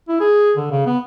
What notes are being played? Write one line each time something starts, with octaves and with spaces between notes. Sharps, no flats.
E4
G#4
D3
C#3
B3